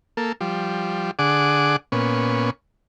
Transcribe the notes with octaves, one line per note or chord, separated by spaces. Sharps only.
A#3 A4
F3 G3
D3 G#4 F#5 D6
A#2 B3 C#4